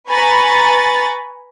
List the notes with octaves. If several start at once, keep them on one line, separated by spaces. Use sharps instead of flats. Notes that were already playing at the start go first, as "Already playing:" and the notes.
B4 G#5 A#5 B5 C#6 A6